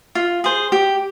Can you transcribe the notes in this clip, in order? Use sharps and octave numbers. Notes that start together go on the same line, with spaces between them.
F4
G#4 C5
G4